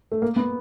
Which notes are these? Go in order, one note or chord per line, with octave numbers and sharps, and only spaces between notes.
A3
A#3
B3